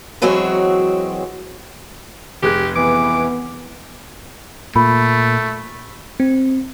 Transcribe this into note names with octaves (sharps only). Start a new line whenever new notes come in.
E3 F#3 G#3 C4 F#4 C#5
F1 G4 G#4 F#6
E3 B3 D6
A#2 A3 B5
C4